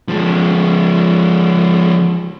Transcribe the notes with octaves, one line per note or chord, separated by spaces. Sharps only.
F3 G#3